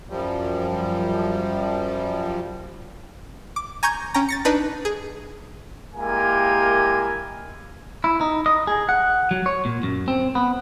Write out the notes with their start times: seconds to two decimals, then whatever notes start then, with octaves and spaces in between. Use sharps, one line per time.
0.10 F#2 F3 G3
3.56 D6
3.83 G#5 A#5 C#6 G6 G#6
4.14 C#4 G5 A#5
4.29 A6 A#6 C#7
4.45 D4 D#4 B4
4.85 G#4
5.94 G#3 A#3 E4 G4 A#4 G#5
8.04 E4
8.21 D#4
8.46 D#5
8.67 G#4
8.89 F#5
9.31 F#3
9.46 C#5
9.65 A#2
9.83 F#2
10.08 C4
10.35 B3